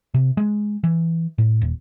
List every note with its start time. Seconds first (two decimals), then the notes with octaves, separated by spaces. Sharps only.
0.14 C3
0.37 G#3
0.84 E3
1.38 A2
1.61 D#1